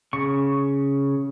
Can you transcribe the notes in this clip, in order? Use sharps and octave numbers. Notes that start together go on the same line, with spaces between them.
C#3 C#6